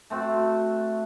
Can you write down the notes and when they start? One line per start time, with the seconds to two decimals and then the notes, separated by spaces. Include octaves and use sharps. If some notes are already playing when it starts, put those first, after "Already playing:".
0.10 A3 C4 F#4